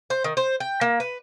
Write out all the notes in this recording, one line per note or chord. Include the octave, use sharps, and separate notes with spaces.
C5
D#3
C5
G5
A#3
B4